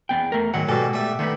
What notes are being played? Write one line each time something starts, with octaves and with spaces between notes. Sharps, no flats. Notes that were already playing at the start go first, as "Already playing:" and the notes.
E2 B3 G5
A3 A#4
G#2 D#3 F#3 F#5
G#2 B2 G3 F#4 A4
G3 A3 E5
D3 D#3 A3 B3